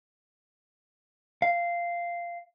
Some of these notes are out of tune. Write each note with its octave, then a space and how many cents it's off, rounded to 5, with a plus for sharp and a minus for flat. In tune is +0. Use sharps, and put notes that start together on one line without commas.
F5 -10